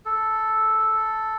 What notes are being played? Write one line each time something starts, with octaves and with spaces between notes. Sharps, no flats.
A4